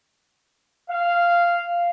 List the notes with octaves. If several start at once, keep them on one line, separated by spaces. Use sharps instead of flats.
F5